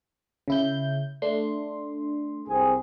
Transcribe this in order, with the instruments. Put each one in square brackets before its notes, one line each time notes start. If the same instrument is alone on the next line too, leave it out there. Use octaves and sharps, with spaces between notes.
[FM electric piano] C#3 E4 G6
A3 D4 C6
[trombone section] C2 C4 G#4